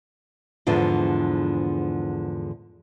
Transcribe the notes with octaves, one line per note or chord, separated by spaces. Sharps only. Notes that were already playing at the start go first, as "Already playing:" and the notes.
E2 G#2 D3 F3